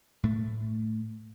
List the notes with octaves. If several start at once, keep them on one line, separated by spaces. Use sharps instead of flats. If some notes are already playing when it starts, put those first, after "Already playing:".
A2 A3